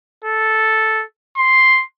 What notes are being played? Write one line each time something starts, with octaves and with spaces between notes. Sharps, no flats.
A4
C6